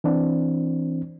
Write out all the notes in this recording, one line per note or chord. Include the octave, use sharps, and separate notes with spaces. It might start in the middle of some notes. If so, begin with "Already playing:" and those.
E3 C4 D4